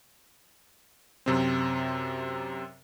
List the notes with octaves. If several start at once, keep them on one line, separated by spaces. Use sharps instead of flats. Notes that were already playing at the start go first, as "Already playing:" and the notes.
F#2 C3 C4